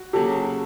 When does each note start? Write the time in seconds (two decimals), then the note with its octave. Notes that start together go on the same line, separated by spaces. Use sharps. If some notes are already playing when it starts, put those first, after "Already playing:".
Already playing: F#4
0.13 C#3 F#3 A#3 C#4 G4 A4